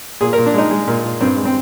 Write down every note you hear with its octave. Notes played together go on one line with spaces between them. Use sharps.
A#2 G#4
A#4
A#2
D4
G#3 D#4
G#3
A#2 A#3
A#2
G2 C4
G#3
C4